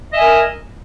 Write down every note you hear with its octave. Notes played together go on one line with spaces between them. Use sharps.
A#4 D#5 E5 G#5